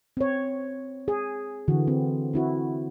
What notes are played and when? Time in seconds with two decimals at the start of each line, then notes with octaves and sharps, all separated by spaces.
0.17 C4 C#5
1.08 G#4
1.68 D3 E3 F#4
1.88 C4
2.34 C4 E4 F#4